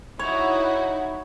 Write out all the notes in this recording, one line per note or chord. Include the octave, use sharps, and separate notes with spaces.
D#4 E4 F#4 C#5